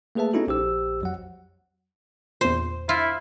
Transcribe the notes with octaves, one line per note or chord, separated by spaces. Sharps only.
A3 A#3 G#4 B4 E5 A5
B3 C#4 D#4 E4 F#4 A4
A#1 G4 C5 E6
F2 F#3 F#5
E2 A#2 C5
E4 F4